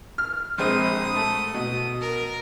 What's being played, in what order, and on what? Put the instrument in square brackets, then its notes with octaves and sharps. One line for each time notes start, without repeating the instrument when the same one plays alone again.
[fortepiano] F6
[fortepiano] A#1 G#3 C4 [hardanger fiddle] D#6
[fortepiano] A3
B2
[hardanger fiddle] A#4